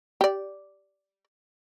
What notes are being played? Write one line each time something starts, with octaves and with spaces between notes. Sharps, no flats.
G4 D5